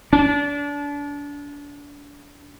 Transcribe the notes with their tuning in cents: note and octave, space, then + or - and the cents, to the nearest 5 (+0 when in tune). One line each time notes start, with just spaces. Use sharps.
D4 -30